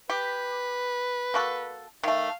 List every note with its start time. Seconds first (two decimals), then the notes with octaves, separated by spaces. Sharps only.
0.10 G4 B4
1.34 A#3 F#4 A4
2.03 D#3 A3 F5